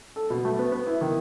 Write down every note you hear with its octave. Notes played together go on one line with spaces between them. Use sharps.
A4
B2
A3
B3
B3
E4
D#3